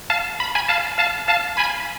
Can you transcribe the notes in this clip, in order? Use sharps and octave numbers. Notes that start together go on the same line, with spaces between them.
F5 A5
B5
G#5 B5
F5 A5
F5 A5
F5 A5
G#5 B5